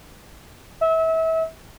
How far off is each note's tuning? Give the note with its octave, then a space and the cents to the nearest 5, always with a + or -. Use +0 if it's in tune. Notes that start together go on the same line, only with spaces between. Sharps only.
E5 -30